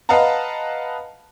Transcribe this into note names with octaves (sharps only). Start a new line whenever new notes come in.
B4 D#5 F5 F#5 A5 A#5